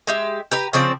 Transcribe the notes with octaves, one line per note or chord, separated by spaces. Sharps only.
G#3 G4 E5
G4 B4 A#5
C#3 F3 C4 D5